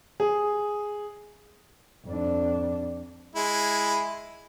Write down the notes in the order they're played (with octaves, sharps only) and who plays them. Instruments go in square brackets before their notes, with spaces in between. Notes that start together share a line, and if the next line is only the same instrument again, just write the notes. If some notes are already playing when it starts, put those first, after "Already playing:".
[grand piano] G#4
[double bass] F2 D4
[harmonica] G#3 E4